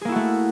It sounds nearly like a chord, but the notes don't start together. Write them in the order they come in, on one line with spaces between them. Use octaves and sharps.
G#4 A#3 E4 F#4 A3